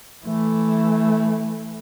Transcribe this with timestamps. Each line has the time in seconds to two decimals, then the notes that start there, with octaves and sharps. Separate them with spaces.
0.26 E3 A3